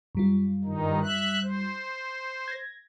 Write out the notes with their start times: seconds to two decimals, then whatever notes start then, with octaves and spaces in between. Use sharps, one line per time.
0.15 F#2 G3 F4
0.64 G2 D#3 D#4
1.03 E5 F#6
1.43 C5
2.48 G#6 A#6